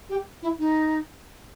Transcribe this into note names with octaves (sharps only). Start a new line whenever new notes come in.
G4
E4
D#4